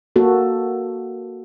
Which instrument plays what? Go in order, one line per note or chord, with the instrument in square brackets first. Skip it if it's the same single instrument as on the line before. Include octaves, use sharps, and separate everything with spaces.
[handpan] A#3 F#4 A4